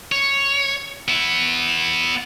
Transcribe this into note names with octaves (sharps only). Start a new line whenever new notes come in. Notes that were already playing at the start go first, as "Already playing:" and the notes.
C#5
B3 E4